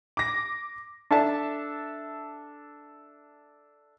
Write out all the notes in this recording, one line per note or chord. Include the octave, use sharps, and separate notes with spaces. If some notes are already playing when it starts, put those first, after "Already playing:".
D6 A#6
D4 A4 E5 A5